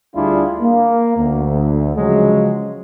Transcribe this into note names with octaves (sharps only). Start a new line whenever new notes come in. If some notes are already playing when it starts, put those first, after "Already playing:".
D2 G3 D4 E4 F4 G#4
A#3
D2
C#3 F3 F#3 G#3